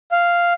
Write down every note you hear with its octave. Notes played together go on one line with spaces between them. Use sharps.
F5